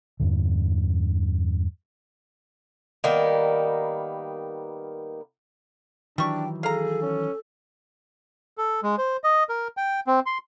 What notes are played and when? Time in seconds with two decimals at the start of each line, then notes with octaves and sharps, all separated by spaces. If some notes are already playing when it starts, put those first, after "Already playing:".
0.20 E2 G2 D3
3.04 D#3 G3 A#3 B3
6.18 D#3 E3 F#3 G3 D4 G5 C#6
6.63 G#4 A4 F5 A#5
7.02 C#4
8.58 A4
8.83 G#3
8.98 C5
9.24 D#5
9.49 A#4
9.77 G5
10.07 C4
10.26 C6